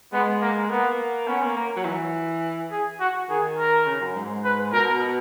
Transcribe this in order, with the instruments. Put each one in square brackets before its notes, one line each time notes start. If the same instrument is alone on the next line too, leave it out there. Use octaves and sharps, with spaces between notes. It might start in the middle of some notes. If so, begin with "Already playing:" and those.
[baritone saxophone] G#3 [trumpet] B3
[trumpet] A#3
[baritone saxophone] A#3 [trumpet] B3
[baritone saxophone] B3 [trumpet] C#4
[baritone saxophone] A#3
A#3
F#3
E3
[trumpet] G#4
F#4
[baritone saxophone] D#3 [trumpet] G#4
[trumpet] A#4
[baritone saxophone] C#3
F#2
G#2
[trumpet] B4
[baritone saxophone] B2 [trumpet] A#4